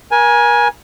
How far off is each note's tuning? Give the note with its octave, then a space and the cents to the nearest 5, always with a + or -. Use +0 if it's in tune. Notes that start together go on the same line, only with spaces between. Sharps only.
A#4 +35 G#5 +0